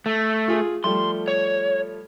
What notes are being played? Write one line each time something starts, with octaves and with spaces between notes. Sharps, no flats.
A3
F4 G#4
F3 G3 A3 C6
C#5